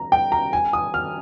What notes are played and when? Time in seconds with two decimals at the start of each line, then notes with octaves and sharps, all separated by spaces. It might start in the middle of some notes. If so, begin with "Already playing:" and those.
Already playing: A#5
0.12 G5
0.32 A#5
0.53 G#5
0.73 D#6
0.94 F6